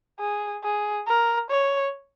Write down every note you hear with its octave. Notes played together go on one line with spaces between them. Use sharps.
G#4
G#4
A#4
C#5